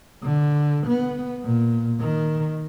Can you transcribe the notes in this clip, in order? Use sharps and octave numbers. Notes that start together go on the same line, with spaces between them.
D3
B3
A#2
D#3